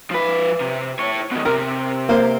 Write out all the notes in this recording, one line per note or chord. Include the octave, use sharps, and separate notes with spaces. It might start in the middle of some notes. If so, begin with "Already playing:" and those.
F3 B4
C3
E4 C#5
B2 D#3
C3 A#4
A#3 C5